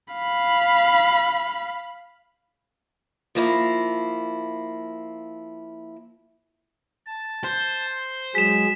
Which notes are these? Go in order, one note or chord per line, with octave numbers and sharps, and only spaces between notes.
F5 B5
F3 A#3 E4
A5
C5
F#3 G#3 G#4 B6 E7